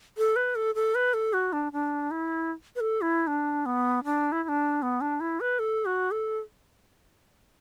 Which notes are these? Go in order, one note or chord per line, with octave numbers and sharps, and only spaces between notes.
A4
B4
A4
A4
B4
A4
F#4
D4
D4
E4
B4
A4
E4
D4
B3
D4
E4
E4
D4
B3
D4
E4
B4
A4
F#4
A4